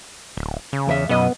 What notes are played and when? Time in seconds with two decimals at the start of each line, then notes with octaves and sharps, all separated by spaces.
0.37 D1
0.73 C#3
0.87 E2 A#4 E5
1.09 B1 F#2 B3 D#5